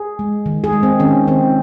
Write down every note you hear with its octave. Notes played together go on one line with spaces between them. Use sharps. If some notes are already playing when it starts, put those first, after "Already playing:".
Already playing: G#4
G#3
D#3
G#4
G#3
C4
D#3 C#4
D#3 C4